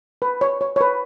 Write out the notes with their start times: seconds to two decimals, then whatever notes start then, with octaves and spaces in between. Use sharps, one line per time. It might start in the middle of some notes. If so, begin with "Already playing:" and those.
0.22 B4
0.41 C#5
0.61 C#5
0.76 C#5
0.81 B4